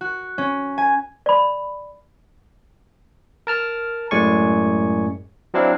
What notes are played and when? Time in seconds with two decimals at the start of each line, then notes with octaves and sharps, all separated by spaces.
0.01 F#4
0.38 C#4
0.78 G#5
1.26 D5 B5
3.47 A#4 A5 F6
4.11 F#2 A2 G#3 D5 G#5 C#6
5.54 F#3 C4 D4 E4 F5